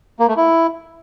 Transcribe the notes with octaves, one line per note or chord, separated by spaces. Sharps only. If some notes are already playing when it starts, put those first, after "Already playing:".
A#3
A3
E4